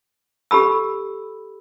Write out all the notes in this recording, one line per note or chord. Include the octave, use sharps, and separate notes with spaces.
G4 A4 B5 E6